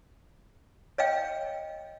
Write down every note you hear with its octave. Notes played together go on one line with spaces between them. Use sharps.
C#5 D#5 F5 G5